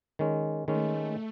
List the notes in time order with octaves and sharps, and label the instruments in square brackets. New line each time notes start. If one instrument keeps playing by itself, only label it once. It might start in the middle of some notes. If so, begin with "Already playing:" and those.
[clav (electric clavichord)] D#3 G#3 C#4
[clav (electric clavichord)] D#3 G#3 C#4 [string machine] A3